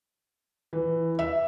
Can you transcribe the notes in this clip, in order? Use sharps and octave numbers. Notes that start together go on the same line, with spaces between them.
E3
E5